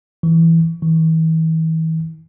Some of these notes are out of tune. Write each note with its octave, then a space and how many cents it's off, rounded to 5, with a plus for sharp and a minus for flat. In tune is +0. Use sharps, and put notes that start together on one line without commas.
E3 +0
E3 -40